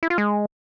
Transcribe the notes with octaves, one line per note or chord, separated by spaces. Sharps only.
E4
F4
G#3